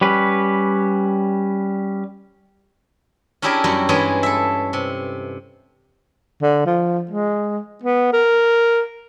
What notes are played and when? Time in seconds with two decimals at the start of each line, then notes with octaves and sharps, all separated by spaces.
0.01 G3 C#4 B4
3.42 C#4 D4 E4 G4 G#4 A#4
3.64 F#2 G3 E4 F#4
3.89 G2 E3 G#3 C#4 G#4 B4
4.23 A4 E5
4.73 C3
6.42 D3
6.66 F3
7.11 G#3
7.83 B3
8.13 A#4